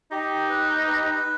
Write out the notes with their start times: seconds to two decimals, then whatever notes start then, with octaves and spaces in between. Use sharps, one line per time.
0.11 D#4 G4
0.49 B4
0.87 B4